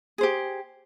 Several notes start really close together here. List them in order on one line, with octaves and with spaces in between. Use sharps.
G#4 C5 G4